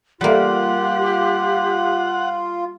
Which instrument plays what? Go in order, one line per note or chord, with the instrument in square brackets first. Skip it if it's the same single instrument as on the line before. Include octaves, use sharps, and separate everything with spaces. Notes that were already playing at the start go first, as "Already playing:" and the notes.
[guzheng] G3 A#3 [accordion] F4 [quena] G4 [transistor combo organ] F#5